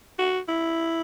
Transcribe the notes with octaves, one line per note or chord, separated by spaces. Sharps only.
F#4
E4